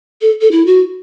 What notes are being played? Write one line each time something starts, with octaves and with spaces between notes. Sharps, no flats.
A4
A4
E4
F#4